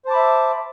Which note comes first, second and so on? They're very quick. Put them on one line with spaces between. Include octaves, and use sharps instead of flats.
C5 A5 D6 B5 E5